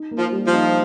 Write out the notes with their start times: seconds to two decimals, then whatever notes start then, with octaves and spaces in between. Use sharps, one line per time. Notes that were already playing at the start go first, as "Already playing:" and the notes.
Already playing: D#4
0.11 A#3
0.18 F3
0.32 G3
0.47 F3
0.53 D#4